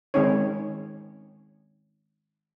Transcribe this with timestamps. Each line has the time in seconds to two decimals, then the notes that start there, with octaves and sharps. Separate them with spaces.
0.14 D#3 G#3 C4 C#4 D#4 C#5